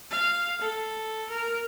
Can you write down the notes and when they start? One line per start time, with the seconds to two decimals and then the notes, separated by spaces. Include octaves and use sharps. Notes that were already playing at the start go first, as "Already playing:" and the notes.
0.10 F5
0.61 A4
1.30 A#4